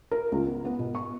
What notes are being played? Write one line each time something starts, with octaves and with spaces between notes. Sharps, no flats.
A#4
C#2
B3
B3
B2
C#6